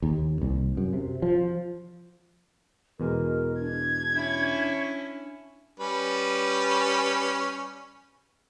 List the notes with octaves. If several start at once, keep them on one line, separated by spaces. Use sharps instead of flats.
D#2
C2
F#2
C3
F3
E2 B2 G#3 A#4
D4 G#6
C#4 E4
G3 C#4 B4